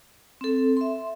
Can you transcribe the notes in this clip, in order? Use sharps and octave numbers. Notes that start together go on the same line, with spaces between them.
C4 A4
E5 C6